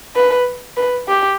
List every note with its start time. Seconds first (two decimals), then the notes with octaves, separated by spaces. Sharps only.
0.16 B4
0.77 B4
1.08 G4